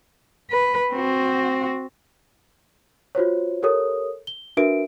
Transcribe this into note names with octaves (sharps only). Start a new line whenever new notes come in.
B4
C4 F#4
F4 F#4 C5 C#5
G4 A4 A#4 C#5 D#6
G7
D4 F#4 A#4 B4 E5 D7